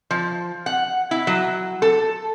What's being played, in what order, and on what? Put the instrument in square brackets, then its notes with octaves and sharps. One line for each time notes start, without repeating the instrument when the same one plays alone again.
[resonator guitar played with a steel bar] F3
F#5
E4
F#3
A4